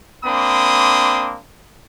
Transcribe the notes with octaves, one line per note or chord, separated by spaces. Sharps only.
A#3 C4 D4 B5 C6 D#6